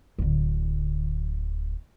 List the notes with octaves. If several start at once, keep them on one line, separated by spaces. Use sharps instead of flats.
D1 D3